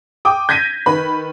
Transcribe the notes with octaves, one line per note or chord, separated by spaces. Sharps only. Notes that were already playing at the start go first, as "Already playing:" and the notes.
G5 D6 D#6
G6 G#6 A#6 B6 D#7
D#3 B4 B5